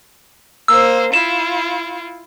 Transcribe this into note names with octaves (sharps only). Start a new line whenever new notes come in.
A#3 C5 E6
E4 F4 E7